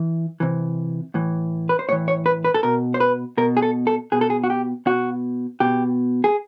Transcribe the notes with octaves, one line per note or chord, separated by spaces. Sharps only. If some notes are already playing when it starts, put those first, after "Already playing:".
Already playing: E3
C3 E3
A2 E3
B4
C5
A2 E3 C#5
C#5
B4
B4
A4
B2 A#4
C5
B4
B2 A#4
G#4
A4
A4
B2 G#4
A4
G#4
F#4
G4
B2 F#4
B2 G4
G#4